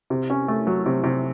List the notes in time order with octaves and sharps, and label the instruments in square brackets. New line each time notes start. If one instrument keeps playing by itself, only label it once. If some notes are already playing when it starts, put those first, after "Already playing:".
[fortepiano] C3
C#4
A3
F#3
C3
C3